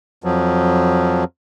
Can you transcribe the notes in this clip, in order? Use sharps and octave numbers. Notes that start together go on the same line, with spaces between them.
F2 F3 F#3